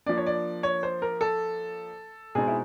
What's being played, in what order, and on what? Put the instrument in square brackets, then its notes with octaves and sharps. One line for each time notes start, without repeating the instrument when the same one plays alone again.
[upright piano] F3 A#3 D4 D5
C#5
D5
C#5
C5
A#4
A4
B2 G#3 C4 D#4 G#4
E4